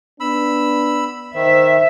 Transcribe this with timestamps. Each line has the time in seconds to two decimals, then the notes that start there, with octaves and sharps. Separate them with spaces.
0.20 B3 D4 B5 E6
1.35 D#3 C5 E5